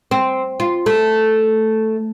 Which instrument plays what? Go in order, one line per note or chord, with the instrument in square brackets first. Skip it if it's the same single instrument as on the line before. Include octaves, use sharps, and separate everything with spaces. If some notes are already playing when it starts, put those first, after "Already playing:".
[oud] C4
F4
A3